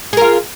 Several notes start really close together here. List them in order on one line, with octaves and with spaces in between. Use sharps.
G#4 A#4 F4